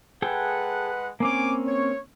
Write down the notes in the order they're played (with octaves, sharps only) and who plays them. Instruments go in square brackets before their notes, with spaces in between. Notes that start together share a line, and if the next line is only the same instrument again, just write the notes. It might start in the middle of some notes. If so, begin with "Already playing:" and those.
[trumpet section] G#3 B4 F#5 [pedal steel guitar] G#4 A4 G5
[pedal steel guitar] A#3 C4 C#4 [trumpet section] G#5 D6
[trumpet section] C#5